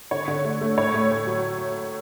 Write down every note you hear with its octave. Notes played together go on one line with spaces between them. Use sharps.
D3 C#5
D3
A3
A3
A2 C#5
A3
A2
F#3